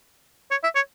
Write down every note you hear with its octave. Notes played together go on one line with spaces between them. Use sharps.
C#5
E5
C#5